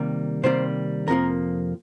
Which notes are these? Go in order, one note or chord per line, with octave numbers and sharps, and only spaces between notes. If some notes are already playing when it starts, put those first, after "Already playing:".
Already playing: C3 D#3 G3 A#3
C3 D#3 G3 A#3 C5
F2 C3 F3 A#3 A#4